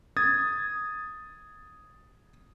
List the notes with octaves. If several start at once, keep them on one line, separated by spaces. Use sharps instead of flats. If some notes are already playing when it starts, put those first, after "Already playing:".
D#6 G#6 A6